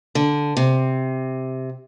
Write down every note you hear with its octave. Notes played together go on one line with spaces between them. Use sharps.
D3
C3